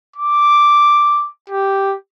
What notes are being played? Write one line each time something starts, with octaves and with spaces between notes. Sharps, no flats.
D6
G4